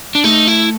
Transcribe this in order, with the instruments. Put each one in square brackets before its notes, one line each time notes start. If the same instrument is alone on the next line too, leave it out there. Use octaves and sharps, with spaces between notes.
[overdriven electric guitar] D4
[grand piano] A3 [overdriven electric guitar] D#4
[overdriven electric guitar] E4